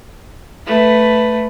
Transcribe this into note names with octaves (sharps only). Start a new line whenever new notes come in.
A3 B4